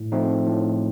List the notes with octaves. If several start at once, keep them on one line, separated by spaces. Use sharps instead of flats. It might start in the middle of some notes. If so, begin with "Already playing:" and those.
Already playing: A2
F3 A3 C4 D#4
A2